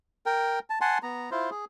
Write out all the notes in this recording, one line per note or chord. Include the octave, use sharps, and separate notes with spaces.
A#4 G5
A5
F#5 G#5 A5 C6
B3 A#5
E4 F4 C5
G#4